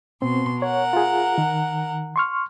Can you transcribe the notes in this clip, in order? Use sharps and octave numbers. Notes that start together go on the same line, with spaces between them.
B2 C4 C6
A#4 C#5 F#5
F4 G#4
D#3
C6 C#6 F6